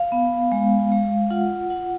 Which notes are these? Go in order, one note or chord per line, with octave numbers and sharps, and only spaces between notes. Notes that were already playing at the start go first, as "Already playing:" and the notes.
Already playing: F5
B3
G#3
G#3
F4 F#5
F#5
F4 F#5